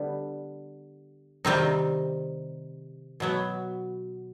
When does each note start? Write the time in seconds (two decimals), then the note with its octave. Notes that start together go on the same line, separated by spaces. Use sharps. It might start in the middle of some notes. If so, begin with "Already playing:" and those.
Already playing: D3 G3 B3
1.45 C3 D#3 G3 C4 D#4
3.20 B2 F#3 B3